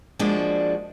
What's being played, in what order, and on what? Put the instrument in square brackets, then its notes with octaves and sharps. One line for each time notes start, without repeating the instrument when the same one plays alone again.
[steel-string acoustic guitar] F3 G#3 A#3 D4 F#4